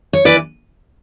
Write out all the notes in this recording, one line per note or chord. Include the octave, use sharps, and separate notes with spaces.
C#5
E3 B4 D5